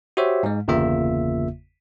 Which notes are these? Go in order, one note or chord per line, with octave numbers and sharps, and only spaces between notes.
F#4 G4 C5 C#5 E5
G#2 G#3
G1 E2 C#3 A#3 F4 E5